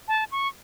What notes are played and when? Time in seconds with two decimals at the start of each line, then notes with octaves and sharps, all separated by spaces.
0.08 A5
0.32 C#6